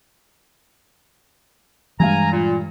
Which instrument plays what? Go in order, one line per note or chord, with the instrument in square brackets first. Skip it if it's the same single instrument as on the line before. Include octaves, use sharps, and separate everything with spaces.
[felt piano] G2 F5 [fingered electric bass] E3 G#3 [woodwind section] G#5 A#5
[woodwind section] A#2